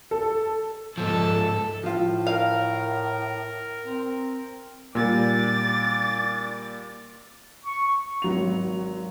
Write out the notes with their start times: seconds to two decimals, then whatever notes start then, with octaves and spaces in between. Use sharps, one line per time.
0.11 A4
0.98 G#2 F3 A4
1.83 A2 F3 F4
2.27 A#4 F5
3.86 C4
4.95 A#2 G3 D6 A6
7.65 C#6
8.22 G#1 F#3 F7